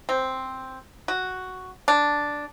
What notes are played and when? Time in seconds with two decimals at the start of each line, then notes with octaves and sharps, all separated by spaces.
0.09 C4
1.08 F#4
1.88 D4